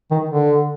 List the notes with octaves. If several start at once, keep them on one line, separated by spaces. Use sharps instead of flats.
D#3
D3